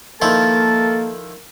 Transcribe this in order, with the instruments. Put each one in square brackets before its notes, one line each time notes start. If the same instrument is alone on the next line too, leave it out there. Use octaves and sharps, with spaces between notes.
[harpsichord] D#3 F3 E4 [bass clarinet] A#3 [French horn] A4 [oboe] A5